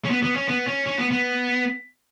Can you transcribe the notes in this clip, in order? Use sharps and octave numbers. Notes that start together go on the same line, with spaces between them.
C#4
B3
B3
C#4
B3
C#4
C#4
B3
B3